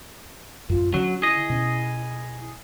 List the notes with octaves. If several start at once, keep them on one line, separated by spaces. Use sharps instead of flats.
A1 F#2 F4
D3 F#3 C#4 F#4
E4 G#4 D#5
B2 C#4